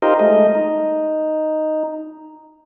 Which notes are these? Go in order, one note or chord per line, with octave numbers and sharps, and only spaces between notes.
D#4 F4 G4 A#4 C5 D#5
G#3 A3 D#5
D#4